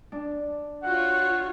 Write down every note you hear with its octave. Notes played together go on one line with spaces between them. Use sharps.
D4
F4 F#4 C#5 F#5